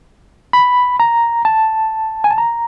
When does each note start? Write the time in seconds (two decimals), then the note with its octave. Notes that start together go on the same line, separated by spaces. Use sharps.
0.53 B5
1.00 A#5
1.45 A5
2.24 G#5
2.31 A5
2.38 A#5